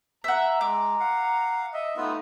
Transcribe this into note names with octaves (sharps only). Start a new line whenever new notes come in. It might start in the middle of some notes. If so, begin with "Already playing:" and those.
E5 F#5 A#5
G#3 D6
F5 F#5
D#5 E5
A3 B3 D#4 F4 B4